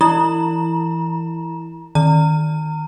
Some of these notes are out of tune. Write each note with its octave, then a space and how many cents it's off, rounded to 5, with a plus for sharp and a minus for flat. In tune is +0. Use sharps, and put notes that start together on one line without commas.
E3 +5 E4 +0 A#5 +40
D#3 +0 A#5 -30